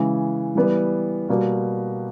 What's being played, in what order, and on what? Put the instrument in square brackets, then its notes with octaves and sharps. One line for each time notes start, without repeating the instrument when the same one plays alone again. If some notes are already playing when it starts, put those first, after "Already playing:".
Already playing: [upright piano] C#3 E3 G#3
E3 G3 B3
B2 G3 A#3